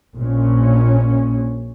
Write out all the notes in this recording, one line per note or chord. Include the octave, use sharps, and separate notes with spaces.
A#1 A#2 C#4